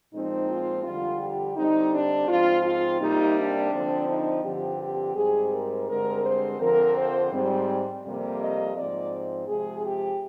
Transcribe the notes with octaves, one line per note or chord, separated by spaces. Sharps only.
A#2 F3 G#3 C4 D#4
F4
F2 D3 G3 F4
G4
D3 G3 C4 D#4
D4
G#2 F3 C4 F4
F4
C3 G3 A#3 D#4
D4
D3 F3 C4
D#4
G2 D3 F3 C4 G4
G4
G#2 G3 C4 G#4
A#4
G2 D3 G#3 C4 A#4
C5
F2 D3 F3 C4 A#4
C5
G#2 G3 C4
F2 C3 G3 A#3
D#5
G#2 F3 C4 D5
C3 F3 G#3 G#4
G4